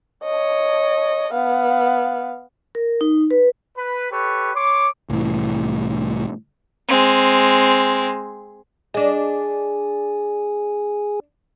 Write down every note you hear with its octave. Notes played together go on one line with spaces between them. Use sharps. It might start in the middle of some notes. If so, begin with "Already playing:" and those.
C#5 D#5
B3 F5
A#4
D#4
B4
B4
G4 A4 B4 C#5
C#5 C6 D6
C2 A2 E3
G#3 C4
D4 G#4 D#5